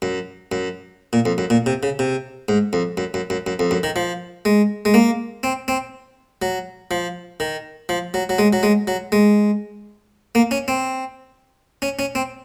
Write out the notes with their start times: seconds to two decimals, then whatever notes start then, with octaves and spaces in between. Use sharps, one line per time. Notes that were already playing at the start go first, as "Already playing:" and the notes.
0.02 F#2
0.52 F#2
1.13 A#2
1.25 F2
1.38 F#2
1.50 A#2
1.66 C3
1.83 C#3
1.99 C3
2.49 G#2
2.73 F2
2.97 F#2
3.14 F#2
3.30 F#2
3.47 F#2
3.59 F2
3.71 F#2
3.83 D#3
3.96 F3
4.45 G#3
4.85 G#3
4.94 A#3
5.43 C4
5.68 C4
6.42 F#3
6.91 F3
7.40 D#3
7.89 F3
8.14 F#3
8.29 F#3
8.39 G#3
8.53 F#3
8.63 G#3
8.87 F#3
9.12 G#3
10.35 A#3
10.51 C#4
10.68 C4
11.82 C#4
11.99 C#4
12.15 C4